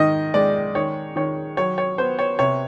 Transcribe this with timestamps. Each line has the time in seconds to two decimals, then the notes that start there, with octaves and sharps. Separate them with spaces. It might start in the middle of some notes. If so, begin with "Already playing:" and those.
Already playing: G#2 D#3 D#5
0.34 G#3 D5
0.75 D#3 C#5
1.16 D#3 C#5
1.57 F#3 C#5
1.78 C#5
1.98 B3 C5
2.19 C#5
2.39 C3 C#5